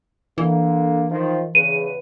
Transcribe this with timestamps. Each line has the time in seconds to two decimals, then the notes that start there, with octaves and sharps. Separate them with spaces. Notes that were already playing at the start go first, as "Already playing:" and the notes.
0.38 D3 E3 A#3
1.11 D#3 F3
1.55 E2 C#3 B4 D#7